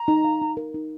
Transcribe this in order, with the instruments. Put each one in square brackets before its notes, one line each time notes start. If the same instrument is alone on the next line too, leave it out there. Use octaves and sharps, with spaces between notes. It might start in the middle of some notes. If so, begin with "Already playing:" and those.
Already playing: [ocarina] A#5
[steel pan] D#4
F5
D#4
A#4
D#4